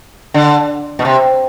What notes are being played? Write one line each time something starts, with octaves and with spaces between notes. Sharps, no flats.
D3
B2
C3